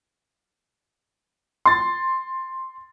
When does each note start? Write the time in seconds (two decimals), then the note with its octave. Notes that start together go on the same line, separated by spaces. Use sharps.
1.65 C6 A6